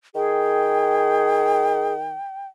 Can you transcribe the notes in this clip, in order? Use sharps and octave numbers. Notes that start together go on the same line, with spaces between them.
D#3 G#4 G5